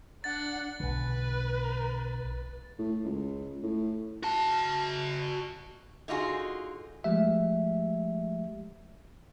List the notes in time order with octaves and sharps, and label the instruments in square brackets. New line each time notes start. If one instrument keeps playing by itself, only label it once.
[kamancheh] D4 F#5 [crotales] A6
[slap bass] B1 D3 [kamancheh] B4
[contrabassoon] A2
C#2
A2
[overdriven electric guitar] F#4 A5
[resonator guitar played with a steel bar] D3 D#4 F4 F#4 G#4
[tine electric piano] F3 G#3 A3 G4 E5